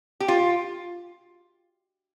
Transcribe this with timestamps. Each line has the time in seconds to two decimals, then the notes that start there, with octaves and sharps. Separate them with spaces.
0.20 G4
0.28 F4